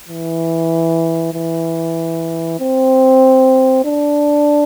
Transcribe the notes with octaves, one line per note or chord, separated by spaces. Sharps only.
E3
E3
C4
D4